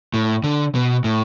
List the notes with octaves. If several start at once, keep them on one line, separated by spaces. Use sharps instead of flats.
A2
D3
B2
A2